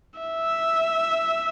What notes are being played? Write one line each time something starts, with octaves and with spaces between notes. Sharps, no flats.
E5